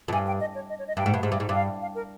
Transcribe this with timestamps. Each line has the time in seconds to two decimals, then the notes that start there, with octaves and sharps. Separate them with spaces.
0.08 F2
0.13 G2 G#5
0.27 G5
0.40 D#5
0.55 C#5
0.69 D#5
0.79 C#5
0.88 D#5
0.97 G2 G5
1.06 G#2
1.14 G2
1.23 G#2
1.32 G2
1.40 G#2
1.49 G2 F5
1.82 F5
1.95 A#4